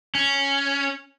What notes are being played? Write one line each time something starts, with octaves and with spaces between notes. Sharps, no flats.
C#4